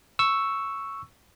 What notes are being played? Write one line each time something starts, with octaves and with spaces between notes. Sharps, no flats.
C#6 E6